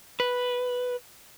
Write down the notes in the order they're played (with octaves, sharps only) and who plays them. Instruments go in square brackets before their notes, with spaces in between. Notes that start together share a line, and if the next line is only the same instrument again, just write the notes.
[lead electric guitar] B4